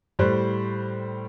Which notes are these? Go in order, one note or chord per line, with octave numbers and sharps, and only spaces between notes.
A2 G3 C5 F#6